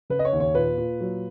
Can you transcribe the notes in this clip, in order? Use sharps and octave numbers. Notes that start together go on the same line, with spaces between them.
C#3 B4
D#5
C#5
D#2
C#5
A#2 B4
A#2
F#3